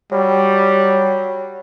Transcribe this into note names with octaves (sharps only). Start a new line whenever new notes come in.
F#3 G3